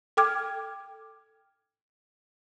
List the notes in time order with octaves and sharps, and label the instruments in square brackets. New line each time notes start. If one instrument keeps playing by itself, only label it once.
[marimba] A4 G5 D6 F6 G#6